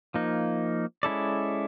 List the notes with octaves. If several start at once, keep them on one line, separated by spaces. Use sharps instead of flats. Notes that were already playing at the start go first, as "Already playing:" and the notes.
F3 A#3 D#4
G#3 C#4 E4 A4 D5